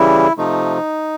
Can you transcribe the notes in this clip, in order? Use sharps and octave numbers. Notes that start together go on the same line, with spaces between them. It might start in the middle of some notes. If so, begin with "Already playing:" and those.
Already playing: C#3 E3 G3 E4
C3 F3 A3 D#4